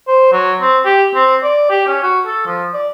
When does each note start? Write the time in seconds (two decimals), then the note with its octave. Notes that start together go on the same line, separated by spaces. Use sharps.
0.07 C5
0.33 F#3
0.61 C4
0.85 G4
1.15 C4
1.43 D5
1.70 G4
1.87 C#4
2.03 F#4
2.26 A4
2.46 F3
2.74 D5